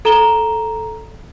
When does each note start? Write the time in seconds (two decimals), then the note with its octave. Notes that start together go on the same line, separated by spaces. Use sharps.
0.05 A4 A#5 E7 G7